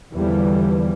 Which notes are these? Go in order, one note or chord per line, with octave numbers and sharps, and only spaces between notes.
E2 D3 E3 F3 G3